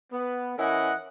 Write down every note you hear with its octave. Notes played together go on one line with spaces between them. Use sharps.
B3
E3 C#4 E4 A#4 D#5 F#5